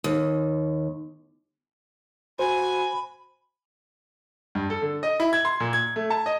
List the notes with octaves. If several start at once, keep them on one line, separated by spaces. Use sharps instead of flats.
D#2
F#4 C5 G#5 B5
G2
A4
D3
D#5
E4
G#6
C6
A#2
G#6
A3
A5
D#5